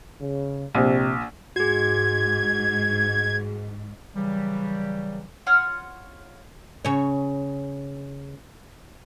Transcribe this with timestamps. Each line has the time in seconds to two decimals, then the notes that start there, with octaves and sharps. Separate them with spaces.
0.20 C#3
0.75 A#1 C3
1.56 G#2 F#4 G#4 G#6
4.15 C#3 E3 F#3 G3
5.47 F4 C#5 F#5 F6
6.85 C#3 C#5